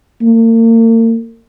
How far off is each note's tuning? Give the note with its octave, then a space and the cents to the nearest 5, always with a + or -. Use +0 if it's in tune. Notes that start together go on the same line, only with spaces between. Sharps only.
A#3 -40